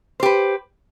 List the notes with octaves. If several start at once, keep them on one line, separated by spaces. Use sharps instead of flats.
G4 B4 C5